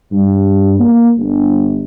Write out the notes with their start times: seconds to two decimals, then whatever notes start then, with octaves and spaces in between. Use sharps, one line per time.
0.11 G2
0.79 A#3
1.17 G1